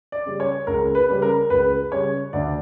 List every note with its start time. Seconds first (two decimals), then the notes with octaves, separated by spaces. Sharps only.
0.12 D5
0.26 C#3 G3
0.40 C#5
0.67 C#2 A#4
0.95 B4
1.09 C#3 G3
1.22 A#4
1.50 C#2 B4
1.92 C#3 G3 C#5
2.33 D2 D5